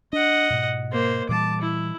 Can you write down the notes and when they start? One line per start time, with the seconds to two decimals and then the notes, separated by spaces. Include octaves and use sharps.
0.13 D4 D#5 F#5
0.50 G#2 B2
0.92 A#3 C5
1.29 A#2 E3 G3 A5 D6
1.61 E4